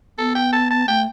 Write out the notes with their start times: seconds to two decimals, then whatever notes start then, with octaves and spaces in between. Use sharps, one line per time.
0.18 B3 A4
0.35 G5
0.53 A5
0.71 A5
0.88 A3 G5